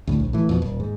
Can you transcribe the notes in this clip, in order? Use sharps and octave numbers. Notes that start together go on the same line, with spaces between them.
D2 A2
A#1
A2 E3
F2 B2
D#1
G#2